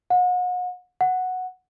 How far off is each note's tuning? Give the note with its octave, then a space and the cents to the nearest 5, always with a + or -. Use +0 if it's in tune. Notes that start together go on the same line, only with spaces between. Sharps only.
F#5 -35
F#5 -5